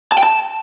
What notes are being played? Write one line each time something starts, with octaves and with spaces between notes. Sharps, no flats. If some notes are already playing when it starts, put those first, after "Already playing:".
A5
G5
A5